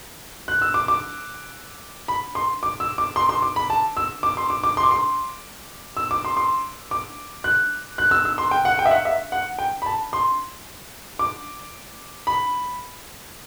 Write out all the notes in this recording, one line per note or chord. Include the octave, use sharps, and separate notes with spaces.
F#6
E6
D6
D6
B5
C6
D6
E6
D6
C6
C6
D6
B5
A5
E6
D6
C6
D6
D6
C6
D6
C6
E6
D6
C6
C6
D6
F#6
F#6
E6
E6
C6
G5
F#5
G5
E5
F#5
E5
F#5
G5
B5
A5
C6
D6
B5